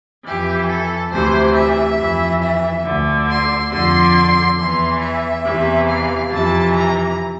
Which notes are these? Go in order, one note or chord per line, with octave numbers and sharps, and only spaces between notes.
F2 E3 G4
A4
D2 C3 E3 C5
E5
F2 E3
E5
D2 D3
C6
F2 D3 C6
E2 E3 C6
E5
E2 C3 E3
F5
F2 C3 E3 A5
A#5